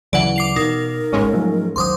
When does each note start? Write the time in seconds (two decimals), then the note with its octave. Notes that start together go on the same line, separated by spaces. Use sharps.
0.13 D2 C#3 E3 F#3 D5 F#5
0.36 D6 C7 F7
0.56 B2 D#4 A#4
1.12 D#1 A1 G#2 G#3 C#4
1.33 F3 F#3 A3
1.76 A#1 D#2 F#3 C5 C6 D6 D#6